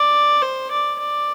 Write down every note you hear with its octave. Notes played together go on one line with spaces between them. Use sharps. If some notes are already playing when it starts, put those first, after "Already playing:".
Already playing: D5
C5
D5
D5